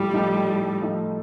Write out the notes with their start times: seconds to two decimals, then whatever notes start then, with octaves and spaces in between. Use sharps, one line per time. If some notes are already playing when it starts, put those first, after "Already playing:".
Already playing: A2 F3 G3 A3
0.14 F3 A3 D#4
0.48 A2
0.82 F3 A3 D#4